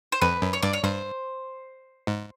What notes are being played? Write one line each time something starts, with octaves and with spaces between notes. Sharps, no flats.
C5
F2 B4
F#2
C#5
G2 D5
C#5
G2 C5
G#2